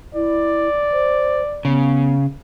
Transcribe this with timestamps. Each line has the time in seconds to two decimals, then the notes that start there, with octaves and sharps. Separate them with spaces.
0.15 E4 D5
0.92 C5
1.65 C#3 B3